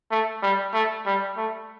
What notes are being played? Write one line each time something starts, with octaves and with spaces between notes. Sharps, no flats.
A3
G3
A3
G3
A3